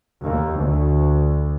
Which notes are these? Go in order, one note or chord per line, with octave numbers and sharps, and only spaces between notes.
D#2
D2